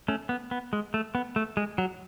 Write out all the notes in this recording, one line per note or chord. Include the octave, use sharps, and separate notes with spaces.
A3 C#4
B3
B3
G#3
A3
B3
A3
G#3
F#3